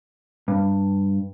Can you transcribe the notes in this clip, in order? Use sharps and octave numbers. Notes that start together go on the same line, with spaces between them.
G2